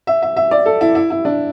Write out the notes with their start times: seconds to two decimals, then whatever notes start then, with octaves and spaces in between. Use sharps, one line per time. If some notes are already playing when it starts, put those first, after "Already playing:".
0.07 E5
0.22 E5
0.36 E5
0.51 D5
0.66 A4
0.81 E4
0.95 E4
1.10 E4
1.25 D4